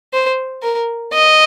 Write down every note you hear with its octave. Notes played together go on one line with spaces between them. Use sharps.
C5
A#4
D#5